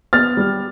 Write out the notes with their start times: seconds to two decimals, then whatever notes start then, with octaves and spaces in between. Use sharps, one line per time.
0.13 B3 F6 A6
0.37 G3